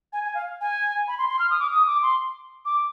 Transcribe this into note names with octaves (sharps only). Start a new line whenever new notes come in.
G#5
G#5
F5
G#5
B5
C6
C6
F6
D#6
D6
D#6
D6
C6
D6